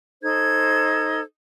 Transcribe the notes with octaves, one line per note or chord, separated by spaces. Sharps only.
D#4 A4 C5 G#6